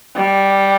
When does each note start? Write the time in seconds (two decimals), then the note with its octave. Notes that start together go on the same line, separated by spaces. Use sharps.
0.16 G3